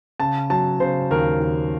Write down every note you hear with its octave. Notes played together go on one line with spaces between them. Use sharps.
C#3 A5
F#3 A5
C#3 C5
D#2 A#4
D#2